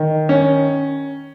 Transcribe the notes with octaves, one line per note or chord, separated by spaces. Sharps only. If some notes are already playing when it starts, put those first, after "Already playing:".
Already playing: D#3
C#4